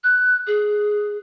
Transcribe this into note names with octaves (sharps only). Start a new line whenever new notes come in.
F#6
G#4